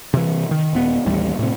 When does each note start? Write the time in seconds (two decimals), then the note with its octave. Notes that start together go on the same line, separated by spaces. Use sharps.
0.14 C3 E3
0.51 D#3
0.73 D#1 B3
1.06 A1 D#2 G3
1.39 A2 C3